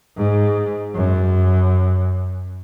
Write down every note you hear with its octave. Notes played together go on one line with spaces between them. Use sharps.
G#2
F#2